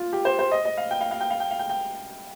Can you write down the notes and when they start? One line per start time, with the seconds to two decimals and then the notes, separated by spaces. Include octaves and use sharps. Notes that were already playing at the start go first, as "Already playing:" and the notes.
Already playing: F4
0.13 G4
0.25 C5
0.39 C5
0.52 D#5
0.65 D#5
0.77 F5
0.91 G5
1.01 F5
1.11 F5
1.21 G5
1.30 F5
1.40 G5
1.51 F5
1.59 G5
1.70 G5